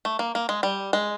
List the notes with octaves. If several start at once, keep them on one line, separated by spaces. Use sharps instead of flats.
A3
A#3
A#3
G#3
G3
G#3